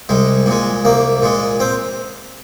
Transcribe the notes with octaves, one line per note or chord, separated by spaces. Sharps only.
C2 G#3
A#2 G#3
C2 A#3
A#2 G#3
C4